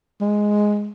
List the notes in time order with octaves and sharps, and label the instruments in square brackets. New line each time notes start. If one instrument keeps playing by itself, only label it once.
[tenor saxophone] G#3